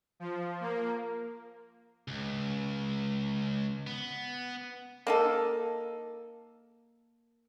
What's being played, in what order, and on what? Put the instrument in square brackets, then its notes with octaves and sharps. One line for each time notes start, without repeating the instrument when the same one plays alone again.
[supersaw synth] F3
A#3
[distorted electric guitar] C#2
B3
[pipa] A#3 D#4 A4